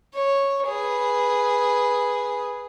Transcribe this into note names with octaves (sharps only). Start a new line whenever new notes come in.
C#5
G#4 B4